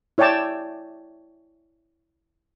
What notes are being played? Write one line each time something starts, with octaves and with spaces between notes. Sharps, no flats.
E4 C#5 D5 G5 A5 D6